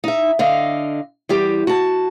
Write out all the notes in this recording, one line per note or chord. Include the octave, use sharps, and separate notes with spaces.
D#4 E5
D3 D#5 F5
E2 G3 G4
F#4 A5